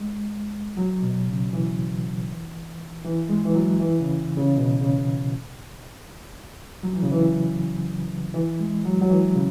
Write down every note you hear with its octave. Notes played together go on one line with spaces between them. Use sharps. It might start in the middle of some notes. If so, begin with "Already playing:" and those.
Already playing: G#3
F#3
B2
C#3
E3
E3
G#3
E3
F#3
E3
C#3
C#3
B2
C#3
F#3
E3
C#3
E3
E3
G#3
F#3
F#3
E3
C#3